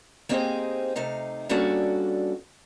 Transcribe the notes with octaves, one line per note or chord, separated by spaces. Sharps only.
A#3 C4 D#4 G4 G#4 C5
C3 A3 D#4 F5
G3 A#3 C#4 D4 F#4 A4